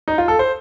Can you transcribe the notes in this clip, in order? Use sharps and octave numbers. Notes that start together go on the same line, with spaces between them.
D#4
F4
A4
C5